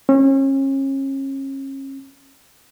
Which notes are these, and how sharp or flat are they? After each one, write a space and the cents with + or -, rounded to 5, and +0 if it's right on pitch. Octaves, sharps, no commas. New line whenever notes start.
C#4 -35